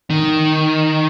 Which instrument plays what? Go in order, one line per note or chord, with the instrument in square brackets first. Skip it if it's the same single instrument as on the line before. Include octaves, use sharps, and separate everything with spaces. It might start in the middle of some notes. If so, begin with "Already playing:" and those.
[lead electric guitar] D#3